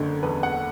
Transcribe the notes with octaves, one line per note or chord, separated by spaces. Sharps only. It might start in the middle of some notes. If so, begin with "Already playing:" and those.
Already playing: F#1 D3
E2 B4
F#5